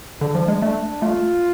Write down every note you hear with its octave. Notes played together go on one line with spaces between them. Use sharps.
D3 D4
F3
G#3
A3 D4
A3 F4